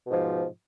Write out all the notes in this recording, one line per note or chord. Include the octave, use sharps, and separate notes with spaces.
G#2 B2 F3